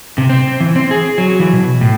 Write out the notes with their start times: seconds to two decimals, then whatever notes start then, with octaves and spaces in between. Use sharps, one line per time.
0.18 C3
0.29 C4
0.60 E3
0.76 C4
0.91 G#4
1.18 F#3
1.40 E3
1.53 B2
1.81 A2